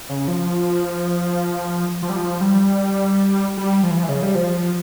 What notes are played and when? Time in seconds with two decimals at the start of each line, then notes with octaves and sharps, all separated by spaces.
0.09 C#3
0.28 F3
2.02 F3
2.10 G3
2.16 F3
2.41 G3
3.57 G3
3.83 F3
3.91 E3
3.97 F3
4.03 E3
4.09 C#3
4.23 G3
4.35 F3